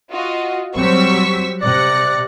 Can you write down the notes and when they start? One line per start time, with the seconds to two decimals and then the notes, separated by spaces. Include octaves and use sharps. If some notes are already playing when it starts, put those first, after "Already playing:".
0.11 F4 F#4 D#5
0.76 F#3 G3 C4 C#6 E6 B6
1.62 C3 D5 F#6 A#6 C#7